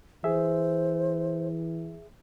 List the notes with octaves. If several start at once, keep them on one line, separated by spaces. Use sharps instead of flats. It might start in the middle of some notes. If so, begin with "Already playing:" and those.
E3 G#4 C5 E5